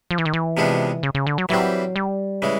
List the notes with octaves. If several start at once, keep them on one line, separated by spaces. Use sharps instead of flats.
F3
E3
D#3
E3
C3 F3 G#3 B3 D4
C#3
C#3
D3
F#3
E3 F#3 G3 C4
G3
C#3 E3 G#3